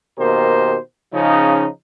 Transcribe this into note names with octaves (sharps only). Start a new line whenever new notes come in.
B2 D#3 A#3 G4 A#4 C5
C#3 F3 D#4